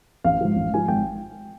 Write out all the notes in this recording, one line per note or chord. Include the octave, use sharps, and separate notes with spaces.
A1 F5
G#2 F3
A1
G#2 F3 G#5
G#1 G5